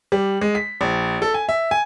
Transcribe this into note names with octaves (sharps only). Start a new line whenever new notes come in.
G3
G#3
B6
A#1
A4
G#5
E5
G#5